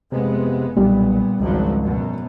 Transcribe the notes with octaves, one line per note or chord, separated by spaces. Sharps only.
F1 C3 G#3 B3
B1 A#2 G3 B3
G#1 C#2 F3 F#3
F#2 B2